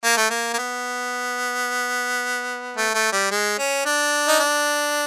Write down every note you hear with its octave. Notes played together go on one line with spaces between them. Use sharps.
A#3
A3
A#3
A#3
B3
A3
A3
G3
G#3
C#4
D4
D#4
D4